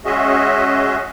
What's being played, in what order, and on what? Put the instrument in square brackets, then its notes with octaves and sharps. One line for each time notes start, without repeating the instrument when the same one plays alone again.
[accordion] G#3 C#4 F#4 G#4 D#5 E5